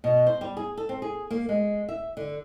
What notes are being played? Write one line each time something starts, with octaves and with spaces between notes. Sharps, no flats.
B2
C5
G3
G#4
A4
C4
G#4
A#3
G#3
E5
D3